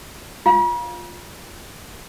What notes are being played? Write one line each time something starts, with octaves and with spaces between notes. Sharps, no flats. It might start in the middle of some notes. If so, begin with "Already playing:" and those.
F4 F5